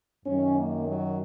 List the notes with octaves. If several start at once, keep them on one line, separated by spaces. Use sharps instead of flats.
F#2 D#3 F#3 C#4
A#3
F#3